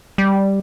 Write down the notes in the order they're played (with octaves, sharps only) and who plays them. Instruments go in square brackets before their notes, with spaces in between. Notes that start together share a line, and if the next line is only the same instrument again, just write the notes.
[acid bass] G3